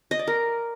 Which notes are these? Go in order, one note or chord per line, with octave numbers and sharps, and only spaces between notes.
D#5
D5
A#4